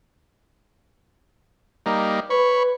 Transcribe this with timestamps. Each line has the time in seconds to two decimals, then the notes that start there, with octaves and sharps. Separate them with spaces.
1.86 G3 A#3 D#4
2.30 B4 C#5 B5 C#6